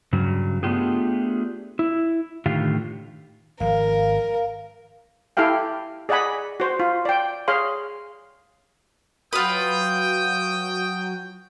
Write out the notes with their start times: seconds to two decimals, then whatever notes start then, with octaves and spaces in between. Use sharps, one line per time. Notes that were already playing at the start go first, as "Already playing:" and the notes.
0.13 G2 C#3 F#3
0.63 A3 B3 D4 F4 G4 G#4
1.79 E4
2.46 A2 D3 D#3 F4 G4 F5
3.60 G#1 F3 A#4 F5
5.37 E4 G4 A4 F5 G5
6.09 G#4 D5 D#5 F#5 G#5 B5
6.60 F#4 C5
6.80 F4
7.05 D5 G5
7.48 G#4 C#5 F5 C6
9.33 F#3 F4 F#4 B4 G5 D#6